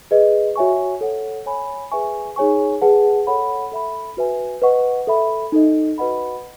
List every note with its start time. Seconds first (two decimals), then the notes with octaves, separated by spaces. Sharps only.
0.11 G#4 B4 D#5
0.56 F#4 C#5 E5 G#5 C#6
1.01 A4 C#5 F#5
1.46 C#5 G#5 B5
1.92 G#4 B4 E5 G#5 C#6
2.36 D#4 G#4 C#5 G#5 C#6
2.82 G#4 B4 F#5 A5
3.27 A4 C#5 F#5 B5
3.72 A4 E5 B5
4.17 F#4 B4 E5 G#5
4.62 B4 D#5 F#5 C#6
5.07 A4 E5 B5
5.52 D#4 A4 D#5
5.98 F#4 B4 D#5 F#5 B5